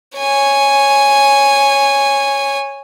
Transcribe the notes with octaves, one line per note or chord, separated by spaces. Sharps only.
C#5 G#5